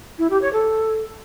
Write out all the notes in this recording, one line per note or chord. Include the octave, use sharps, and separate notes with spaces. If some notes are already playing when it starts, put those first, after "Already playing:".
E4
G4
C#5
A4